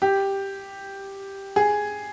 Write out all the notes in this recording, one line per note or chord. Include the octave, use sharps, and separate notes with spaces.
G4
G#4